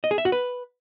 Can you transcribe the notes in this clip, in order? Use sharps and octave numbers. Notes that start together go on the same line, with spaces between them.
D#5
G#4
E5
F#4
B4